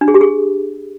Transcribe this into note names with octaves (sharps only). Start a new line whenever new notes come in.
D4
G#4
G4
G#4